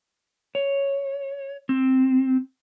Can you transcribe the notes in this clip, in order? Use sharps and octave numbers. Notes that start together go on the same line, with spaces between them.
C#5
C4